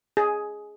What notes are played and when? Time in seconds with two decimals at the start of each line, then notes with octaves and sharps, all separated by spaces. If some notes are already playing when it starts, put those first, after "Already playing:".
0.17 G#4